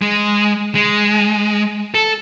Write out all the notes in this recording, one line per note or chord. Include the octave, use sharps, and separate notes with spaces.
G#3
G#3
A4